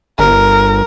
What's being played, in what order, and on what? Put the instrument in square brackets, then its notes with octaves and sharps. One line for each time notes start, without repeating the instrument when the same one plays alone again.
[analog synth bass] G1 [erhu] A#4